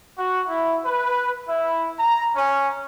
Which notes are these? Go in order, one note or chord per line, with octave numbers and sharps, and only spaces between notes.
F#4
E4
B4
E4
A#5
C#4